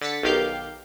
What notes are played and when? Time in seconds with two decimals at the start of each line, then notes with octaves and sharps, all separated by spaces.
0.01 D3 A6 B6 C#7
0.23 B1 D#3 G4 F5 G6